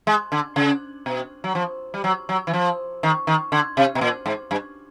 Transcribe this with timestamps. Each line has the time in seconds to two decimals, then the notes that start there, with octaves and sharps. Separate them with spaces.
0.07 G#3
0.32 D3
0.56 C#3
1.06 B2
1.44 F#3
1.55 F3
1.94 G3
2.04 F#3
2.29 F#3
2.47 E3
2.53 F3
3.03 D#3
3.27 D#3
3.52 D3
3.77 C3
3.95 B2
4.01 A#2
4.26 G#2
4.51 G2